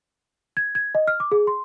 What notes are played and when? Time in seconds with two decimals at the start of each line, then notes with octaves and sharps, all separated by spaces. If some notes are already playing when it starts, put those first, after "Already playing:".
0.57 G#6
0.75 G#6
0.95 D#5
1.07 F6
1.20 D6
1.32 G#4
1.47 C6